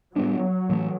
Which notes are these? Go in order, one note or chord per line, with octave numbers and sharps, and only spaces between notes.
A2 F#3 G3 B3 D4
A2 E3 A3